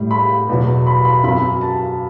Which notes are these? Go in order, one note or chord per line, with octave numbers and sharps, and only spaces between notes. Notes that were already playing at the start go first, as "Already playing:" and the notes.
Already playing: A2 G3
B5
E2 B2 F#3
B5
B5
F#2 F#3 B5
A5